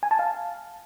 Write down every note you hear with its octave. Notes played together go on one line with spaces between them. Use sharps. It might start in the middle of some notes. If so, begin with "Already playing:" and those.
G#5
A5
F5